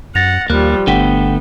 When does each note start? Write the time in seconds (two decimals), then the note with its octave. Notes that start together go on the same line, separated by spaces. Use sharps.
0.15 F#2 F#5 A6 A#6 F7
0.50 D#2 F3 G3 A#3 F#6
0.87 G1 D3 A3 B3 F#5 G5 B6